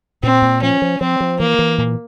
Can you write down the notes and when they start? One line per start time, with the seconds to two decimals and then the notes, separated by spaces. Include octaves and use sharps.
0.23 A#2 C4
0.42 A#2
0.62 F3 C#4
0.82 F3
1.00 F3 C4
1.20 F3
1.39 E3 A#3
1.59 E3
1.78 A#2